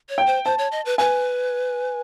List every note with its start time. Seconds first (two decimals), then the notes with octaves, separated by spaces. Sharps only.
0.09 C#5
0.18 G5
0.27 C5
0.45 C5 A5
0.59 C#5
0.72 D#5
0.85 B4
0.98 B4 G#5